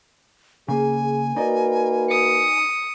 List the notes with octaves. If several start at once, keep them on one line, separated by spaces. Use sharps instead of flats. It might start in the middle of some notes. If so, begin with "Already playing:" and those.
C#3 A#3 G#4 G#5
A#3 D#4 F#4 B4 D5 D#5
D#6 C#7